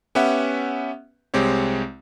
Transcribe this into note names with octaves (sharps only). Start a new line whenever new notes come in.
B3 C#4 G4 B4 E5 F#5
C2 G#3 C4 G4 C#5